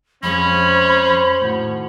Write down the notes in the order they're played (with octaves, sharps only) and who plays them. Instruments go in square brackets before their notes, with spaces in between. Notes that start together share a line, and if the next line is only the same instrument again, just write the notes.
[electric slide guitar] F2 G#3 [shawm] C#4 [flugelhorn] C5 [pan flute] B5
[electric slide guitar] A2 D#3 F#4